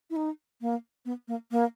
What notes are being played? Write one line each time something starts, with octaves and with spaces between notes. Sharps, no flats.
E4
D#4
A#3
B3
A#3
A#3